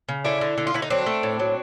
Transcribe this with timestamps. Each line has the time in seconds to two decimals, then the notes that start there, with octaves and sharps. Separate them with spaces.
0.09 C#3
0.25 D3 D4 E4
0.41 D3
0.58 D3
0.67 F4
0.74 D3 E4
0.82 D#4
0.90 F#3 C4 D4
1.06 A3
1.23 A2
1.40 F#3